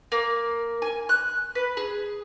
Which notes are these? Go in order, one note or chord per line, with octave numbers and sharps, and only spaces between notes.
A#3
G#5
F#6
B4
G#4